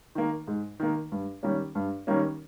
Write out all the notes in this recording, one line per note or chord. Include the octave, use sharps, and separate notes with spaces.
D#3 A#3
G#2
D#3 A#3
G2
D#3 G3 A#3 C#4
G2
D#3 G3 A#3 C#4